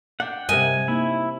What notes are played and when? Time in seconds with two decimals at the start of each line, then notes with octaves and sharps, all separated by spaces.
0.20 D4 F#5 G5
0.49 G2 C3 G3 A#4 D#5 G#5
0.88 A#3 D#4 E4